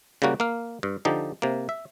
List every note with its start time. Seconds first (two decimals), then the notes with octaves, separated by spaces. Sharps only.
0.22 C#3 G3 A#3 F#4
0.40 A#3 F5
0.83 G2
1.05 D3 F3 D#4 G4
1.42 C3 A#3
1.69 E5